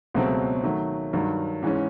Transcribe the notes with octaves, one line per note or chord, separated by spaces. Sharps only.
C#2 B2 F#3 A3 C4
D#3 F#3 A3
G2 D#3 F#3
G#2 E3 G#3 C#4